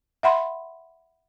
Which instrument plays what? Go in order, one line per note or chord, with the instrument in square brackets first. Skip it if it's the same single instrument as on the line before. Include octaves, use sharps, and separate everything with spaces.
[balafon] E5 F#5 B5 C6